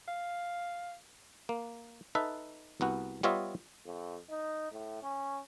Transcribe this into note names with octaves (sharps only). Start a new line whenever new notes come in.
F5
A#3
D#4 A4 B4 E5
C2 B3 F#4
G3 B3 F4 C#5 D#5 E5
F2
D#4
A2
C#4